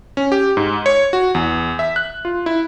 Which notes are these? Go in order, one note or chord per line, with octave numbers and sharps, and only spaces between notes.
C#4
G4
G#2
C#5
F#4
E2
E5
F#6
F4
E4